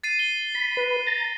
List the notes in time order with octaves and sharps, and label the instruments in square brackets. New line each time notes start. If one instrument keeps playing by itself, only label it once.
[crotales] A6 C7 D#7
G7
[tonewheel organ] B5
B4
A#5 A6